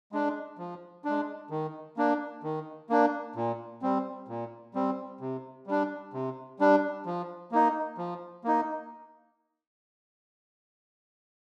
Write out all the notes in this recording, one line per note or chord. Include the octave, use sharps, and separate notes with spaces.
G#3 D4
F3
G#3 D4
D#3
A#3 D4
D#3
A#3 D4
A#2
G3 C4
A#2
G3 C4
C3
G3 D4
C3
G3 D4
F3
A#3 D#4
F3
A#3 D#4